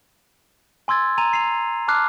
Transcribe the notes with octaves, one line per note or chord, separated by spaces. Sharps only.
G#5 C6 E6 G#6 A6
G#5 A#5 D#7 F7
C7 F7
A5 D6 F6 F#6 C7